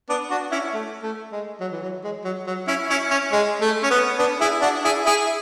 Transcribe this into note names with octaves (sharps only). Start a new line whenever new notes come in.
B3 D4
D4 F#4
C#4 E4
A3
A3
G#3
F#3
E3
F#3
G#3
F#3
F#3
C#4 E4
C#4 E4
C#4
G#3
A3
C#4
B3
B3 D4
E4 G#4
D4 F#4
E4 G#4
E4 G#4